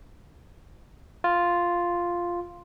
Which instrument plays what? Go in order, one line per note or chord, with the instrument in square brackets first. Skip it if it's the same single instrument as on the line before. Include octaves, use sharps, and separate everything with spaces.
[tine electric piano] F4